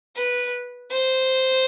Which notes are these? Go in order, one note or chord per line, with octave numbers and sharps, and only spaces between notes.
B4
C5